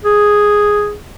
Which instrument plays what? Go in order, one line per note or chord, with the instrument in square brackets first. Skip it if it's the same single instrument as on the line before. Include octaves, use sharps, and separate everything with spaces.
[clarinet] G#4